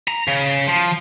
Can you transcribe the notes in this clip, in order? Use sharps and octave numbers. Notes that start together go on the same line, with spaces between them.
A#5
C#3
F3